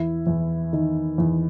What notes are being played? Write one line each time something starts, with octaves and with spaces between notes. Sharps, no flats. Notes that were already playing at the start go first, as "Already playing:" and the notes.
Already playing: E2 E4
E2
D#3
E2